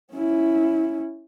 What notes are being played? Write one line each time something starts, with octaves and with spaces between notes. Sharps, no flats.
C#4 E4